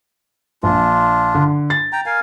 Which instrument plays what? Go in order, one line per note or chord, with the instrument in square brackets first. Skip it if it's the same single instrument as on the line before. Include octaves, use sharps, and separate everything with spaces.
[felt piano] A#1 [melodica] D4 F4
[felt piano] D3
A6
[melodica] G5 A#5
A#4 F5 G#5